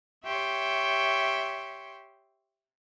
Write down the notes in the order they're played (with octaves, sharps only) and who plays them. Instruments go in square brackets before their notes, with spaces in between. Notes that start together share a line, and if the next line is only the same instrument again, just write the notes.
[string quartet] G4 C#5 E5 G5 C6